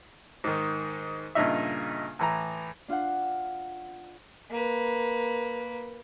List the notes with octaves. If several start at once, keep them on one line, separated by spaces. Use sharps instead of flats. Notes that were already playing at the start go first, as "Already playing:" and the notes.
G#2 D#3
G2 A#2 C#3 D#4 E5
A2 E3 A#5
D4 F4 F5 F#5
A#3 B4